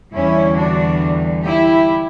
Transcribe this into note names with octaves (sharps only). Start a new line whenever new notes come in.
E2 D3 G3 C#4 E4
D4 F#4
E4 G4